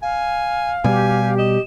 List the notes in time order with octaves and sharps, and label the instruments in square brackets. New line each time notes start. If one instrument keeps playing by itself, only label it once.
[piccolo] F5 [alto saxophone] G#5
[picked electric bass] B2 G3 [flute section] G4 [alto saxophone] G#5
[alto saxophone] D#5 [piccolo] E7